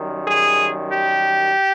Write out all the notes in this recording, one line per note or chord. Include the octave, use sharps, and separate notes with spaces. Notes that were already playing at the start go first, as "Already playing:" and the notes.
Already playing: F#2 D#3 G3
G#4
G4